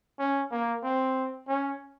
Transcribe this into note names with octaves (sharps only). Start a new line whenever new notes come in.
C#4
A#3
C4
C#4